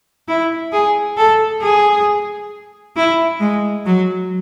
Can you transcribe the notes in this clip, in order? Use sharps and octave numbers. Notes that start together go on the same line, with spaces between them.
E4
G#4
A4
G#4
E4
G#3
F#3